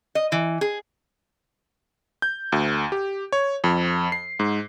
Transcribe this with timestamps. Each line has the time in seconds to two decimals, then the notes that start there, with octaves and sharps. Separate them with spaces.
0.15 D#5
0.32 E3
0.61 G#4
2.22 G6
2.52 D2
2.92 G4
3.32 C#5
3.64 F2
4.12 C7
4.39 G#2